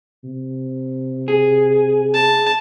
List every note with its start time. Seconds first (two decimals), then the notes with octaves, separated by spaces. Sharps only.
0.24 C3
1.28 G#4
2.14 A5